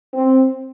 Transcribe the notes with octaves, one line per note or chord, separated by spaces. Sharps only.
C4